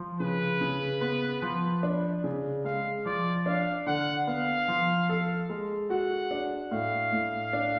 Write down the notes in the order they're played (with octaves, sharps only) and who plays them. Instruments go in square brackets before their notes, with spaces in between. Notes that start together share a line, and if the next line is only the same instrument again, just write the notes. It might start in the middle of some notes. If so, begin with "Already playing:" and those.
Already playing: [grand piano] F3
[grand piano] C#3 [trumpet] B4
[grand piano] C#3
B3
F3
D4
C#3
[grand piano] G#3 [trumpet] F5
[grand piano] F3 [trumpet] D5
[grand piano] D4 [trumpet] F5
[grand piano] D3 [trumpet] F#5
[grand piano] B3 [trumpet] F5
[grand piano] F3
A4
G#3
[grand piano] F#4 [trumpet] F#5
[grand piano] D4
[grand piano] A2 [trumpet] F5
[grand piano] A2
D4